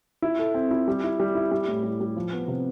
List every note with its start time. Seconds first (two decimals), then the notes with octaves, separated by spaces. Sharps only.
0.22 E4
0.39 A4
0.54 C4
0.71 E4
0.88 G3
1.04 E4
1.20 G3
1.35 E4
1.51 G3
1.68 A2
1.84 G3
2.00 G3
2.16 F3
2.33 B3
2.48 C3